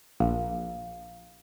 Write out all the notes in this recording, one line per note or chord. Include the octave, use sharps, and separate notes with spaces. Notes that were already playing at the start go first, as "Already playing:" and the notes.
A#1 F5